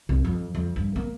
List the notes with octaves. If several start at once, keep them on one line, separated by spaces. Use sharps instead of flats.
C2
F2
F2
G2
A#3